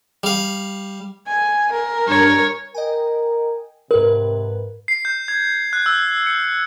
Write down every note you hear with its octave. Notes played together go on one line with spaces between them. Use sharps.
G3 F5
G#5
A#4
G2 D4 C#5
A#4 D#5 G5 G#5
G#2 C3 A#4 B4
C7
G6
G#6
F#6
E6
C#7